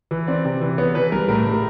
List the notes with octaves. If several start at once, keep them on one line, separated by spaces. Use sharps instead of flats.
E3
C4 D5
C3
E3
B3 C#5
E3 B4
G3 A#4
A2 A#4
A2
A#4